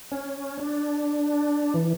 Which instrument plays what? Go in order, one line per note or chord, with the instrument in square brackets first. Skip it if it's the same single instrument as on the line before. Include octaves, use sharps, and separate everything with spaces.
[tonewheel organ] C#4
D4
E3